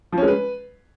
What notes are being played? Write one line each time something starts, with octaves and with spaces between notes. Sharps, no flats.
F3
C#4
G#3
B4